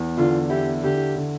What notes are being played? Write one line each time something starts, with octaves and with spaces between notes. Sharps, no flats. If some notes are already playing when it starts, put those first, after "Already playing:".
Already playing: E2
D3 F4
E4 G4
D3 G4
D3